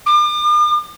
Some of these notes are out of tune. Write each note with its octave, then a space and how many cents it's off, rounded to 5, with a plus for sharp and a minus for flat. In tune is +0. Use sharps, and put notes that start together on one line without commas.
D6 +45